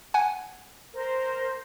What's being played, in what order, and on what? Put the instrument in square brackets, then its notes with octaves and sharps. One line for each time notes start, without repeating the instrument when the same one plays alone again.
[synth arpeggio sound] F#5 G#5
[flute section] A#4 C5